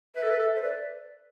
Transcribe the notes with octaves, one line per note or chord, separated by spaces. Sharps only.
B4 E5
A4
B4
A4
C5
B4 D5